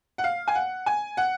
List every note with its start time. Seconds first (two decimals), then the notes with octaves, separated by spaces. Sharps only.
0.18 F#5
0.24 F5
0.48 G#5
0.55 F#5
0.86 G#5
1.17 F#5